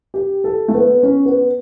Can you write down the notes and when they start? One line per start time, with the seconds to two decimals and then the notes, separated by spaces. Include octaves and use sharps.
0.14 G4
0.44 A4
0.68 A3
0.74 B3
1.03 C#4
1.25 B3